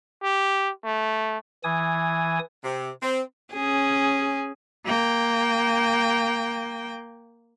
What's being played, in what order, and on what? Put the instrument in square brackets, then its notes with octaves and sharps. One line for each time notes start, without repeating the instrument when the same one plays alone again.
[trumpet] G4
A3
[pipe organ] E3 G#5 D#6
[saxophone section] C3
C4
[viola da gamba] C#4 G#4
[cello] A#3 G5